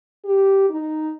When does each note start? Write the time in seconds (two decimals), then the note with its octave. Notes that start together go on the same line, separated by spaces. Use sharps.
0.25 G4
0.70 D#4